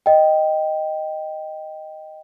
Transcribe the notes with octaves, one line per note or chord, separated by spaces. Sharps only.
D#5 G5